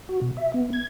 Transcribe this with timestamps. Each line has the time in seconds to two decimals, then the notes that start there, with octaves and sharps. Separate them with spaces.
0.09 F#4
0.21 B2
0.37 E5
0.54 B3
0.73 G#6